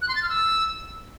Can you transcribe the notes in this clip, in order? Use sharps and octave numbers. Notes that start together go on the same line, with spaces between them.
F#6
C6
A6
F6
E6